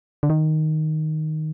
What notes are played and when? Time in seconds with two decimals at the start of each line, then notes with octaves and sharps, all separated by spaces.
0.23 D3
0.30 D#3